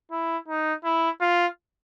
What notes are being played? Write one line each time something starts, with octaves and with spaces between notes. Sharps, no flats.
E4
D#4
E4
F4